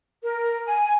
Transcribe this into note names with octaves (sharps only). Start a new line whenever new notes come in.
A#4
G#5